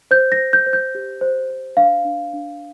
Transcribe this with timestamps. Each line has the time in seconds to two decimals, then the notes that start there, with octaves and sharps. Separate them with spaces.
0.11 C5 G6
0.32 A#6
0.38 C5
0.53 G6
0.66 C5
0.73 G6
0.95 G4
1.21 C5
1.50 C5
1.77 D4 F5
2.05 D4
2.33 D4